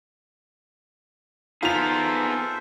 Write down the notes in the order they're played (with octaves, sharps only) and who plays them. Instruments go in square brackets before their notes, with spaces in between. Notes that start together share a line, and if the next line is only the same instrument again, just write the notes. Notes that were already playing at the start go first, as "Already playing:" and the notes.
[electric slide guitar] B3 G#4 [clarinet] D#4 [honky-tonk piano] F4 F7 [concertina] A4 C5 E5